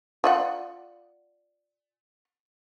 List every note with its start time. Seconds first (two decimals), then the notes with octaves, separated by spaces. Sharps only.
0.24 F4 D5 F#5